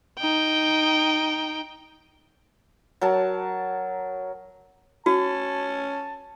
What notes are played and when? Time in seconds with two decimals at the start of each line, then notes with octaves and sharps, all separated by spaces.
0.19 D#4 G5
3.01 F#3 A#4 A5
5.06 C#4 F#4 A5